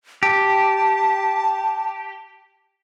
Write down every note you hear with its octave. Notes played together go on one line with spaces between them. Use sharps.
G4 A5